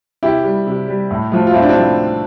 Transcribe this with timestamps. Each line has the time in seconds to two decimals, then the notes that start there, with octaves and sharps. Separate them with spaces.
0.23 C3 E4 G4
0.44 G3
0.67 C3
0.88 G3
1.11 A2
1.32 F3 A3
1.47 F4
1.54 A2 C4 E4
1.62 D4
1.69 C4 E4
1.77 F3 A3